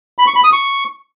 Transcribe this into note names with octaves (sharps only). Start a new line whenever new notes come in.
B5
C#6
B5
D#6
C#6